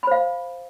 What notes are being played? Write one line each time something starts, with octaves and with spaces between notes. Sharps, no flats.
C5 F5 B5